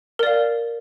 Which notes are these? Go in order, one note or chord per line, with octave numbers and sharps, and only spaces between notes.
A#4 D5 F5